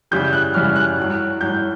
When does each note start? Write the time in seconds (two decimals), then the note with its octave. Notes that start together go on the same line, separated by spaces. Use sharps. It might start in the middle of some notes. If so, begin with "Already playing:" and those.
0.11 F#2 C#3 E3 G3 G6
0.33 F#6
0.54 F#2 C#3 E3 G3 F6
0.76 F#6
0.97 A2 F#3
1.41 A2 F#3 G6